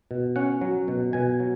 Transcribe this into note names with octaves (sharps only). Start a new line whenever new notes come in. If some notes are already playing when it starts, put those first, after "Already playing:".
B2
C#4 F#5
F#3
B2
B2 G#5
F#3